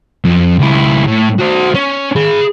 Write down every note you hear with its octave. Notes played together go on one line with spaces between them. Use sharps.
F2
C#2 E4
A2
F#4 C5
C#4
G#4 B5